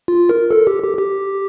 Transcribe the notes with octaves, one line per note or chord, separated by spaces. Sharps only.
F4
A#4
A4
G4
G4
G4